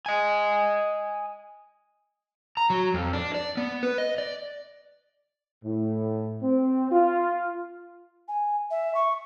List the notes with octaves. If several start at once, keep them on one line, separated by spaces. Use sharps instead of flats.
D#5 G#5
A#5
F#3
F2
D4
D5
B3
B4
D#5
D5
A2
C4
F4
G#5
E5
C#6